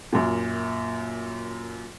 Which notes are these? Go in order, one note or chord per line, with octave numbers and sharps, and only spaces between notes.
F#2 A#2